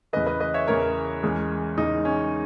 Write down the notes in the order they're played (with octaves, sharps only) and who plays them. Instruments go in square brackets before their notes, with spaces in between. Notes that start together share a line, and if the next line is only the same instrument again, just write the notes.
[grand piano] E2 C#3 E3 B4 D#5
B4 D#5
B4 D#5
C#5 E5
E2 C#3 E3 A#4 C#5
E2 C#3 G#3
E2 C#3 G#3 D#4
C#4